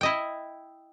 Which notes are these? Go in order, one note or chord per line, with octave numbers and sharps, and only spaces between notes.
E4 D#5 G5